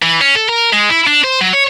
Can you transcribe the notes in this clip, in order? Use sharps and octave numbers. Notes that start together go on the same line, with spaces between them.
E3
C#4
A4
A#4
G#3
E4
D4
C5
F#3
C#5